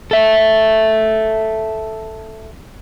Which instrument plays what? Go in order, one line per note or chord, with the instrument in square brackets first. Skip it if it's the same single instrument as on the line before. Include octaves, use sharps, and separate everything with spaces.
[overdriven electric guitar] A4 E5